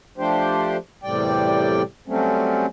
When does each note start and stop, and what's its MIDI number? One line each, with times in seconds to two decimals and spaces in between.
0.18 0.77 53
0.18 0.77 57
0.18 0.77 62
0.18 0.77 67
0.18 0.77 72
1.03 1.82 40
1.03 1.82 45
1.03 1.82 48
1.03 1.82 55
1.03 1.82 74
1.03 1.82 79
2.08 2.66 54
2.08 2.66 55
2.08 2.66 57
2.08 2.66 60
2.08 2.66 61